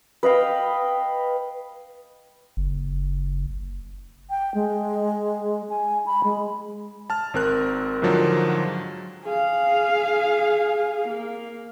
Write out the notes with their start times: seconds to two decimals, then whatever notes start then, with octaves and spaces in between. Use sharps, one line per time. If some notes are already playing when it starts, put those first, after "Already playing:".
0.23 B4 D#5 F5 G5
2.57 F#1
4.30 G5
4.55 G#3
5.70 G#5
6.06 B5
6.24 G#3
7.10 A5 F6
7.34 G#1 C4 A#4 F#6
8.02 G#2 D3 D#3 F3 F#3
9.23 G#4 F5
11.08 A#3